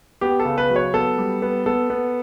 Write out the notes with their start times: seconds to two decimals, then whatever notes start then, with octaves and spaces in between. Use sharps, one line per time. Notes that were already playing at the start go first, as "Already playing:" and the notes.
0.21 B3 G4
0.40 A4
0.45 C#3
0.58 B4
0.70 F#3
0.76 C#5
0.94 B3 A4
1.18 G3
1.42 B3
1.66 B3 A4
1.90 B3